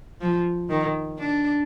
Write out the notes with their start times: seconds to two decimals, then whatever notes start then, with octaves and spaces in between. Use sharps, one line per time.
0.21 F3
0.70 D#3
1.19 D4